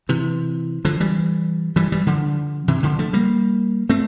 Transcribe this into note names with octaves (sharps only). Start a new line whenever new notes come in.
C3 E3
D3 F3
E3 G3
E3 G3
E3 G3
D3 F3
C3 E3
D3 F3
F3 A3
G3 A#3
A3 C4